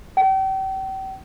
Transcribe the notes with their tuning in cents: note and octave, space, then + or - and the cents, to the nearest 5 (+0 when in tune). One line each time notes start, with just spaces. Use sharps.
G5 -35